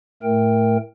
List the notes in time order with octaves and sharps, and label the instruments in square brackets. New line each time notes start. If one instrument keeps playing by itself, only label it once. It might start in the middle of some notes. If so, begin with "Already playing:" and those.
[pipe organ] A2 A3 A#4 G5